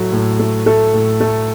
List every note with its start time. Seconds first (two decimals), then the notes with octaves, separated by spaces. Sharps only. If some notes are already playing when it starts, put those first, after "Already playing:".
Already playing: A2 F#3 A3
0.12 A2
0.39 A3
0.66 A3 A4
0.93 A2
1.20 A3